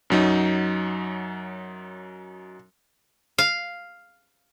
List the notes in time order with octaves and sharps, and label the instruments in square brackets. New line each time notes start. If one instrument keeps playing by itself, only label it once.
[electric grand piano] F#2 F#3 D#4
[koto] F5